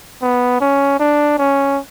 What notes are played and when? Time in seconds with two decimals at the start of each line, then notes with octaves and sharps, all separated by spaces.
0.22 B3
0.61 C#4
0.99 D4
1.38 C#4